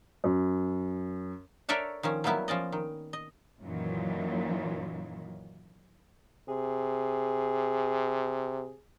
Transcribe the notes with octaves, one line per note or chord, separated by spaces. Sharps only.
F#2
A4 A#4 C#5 D5 E5 F#5
D#3 F3 C#4
F#3 G3 A#3 B3 E4
F3 C#4 D5 D#5
D#3
D#5
F#2 A#2 D#3 E3 F#3
C3 G#4